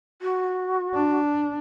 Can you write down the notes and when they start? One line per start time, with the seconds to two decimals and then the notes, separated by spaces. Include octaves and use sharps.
0.22 F#4
0.94 D4